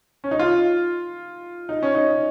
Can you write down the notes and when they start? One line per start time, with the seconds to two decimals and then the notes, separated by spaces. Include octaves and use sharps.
0.24 C#4
0.31 D#4
0.39 F4
1.69 D#4
1.83 C#4
1.95 D#4